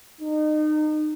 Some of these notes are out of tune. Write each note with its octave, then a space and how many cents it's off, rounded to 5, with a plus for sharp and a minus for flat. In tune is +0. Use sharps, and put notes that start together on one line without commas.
D#4 -30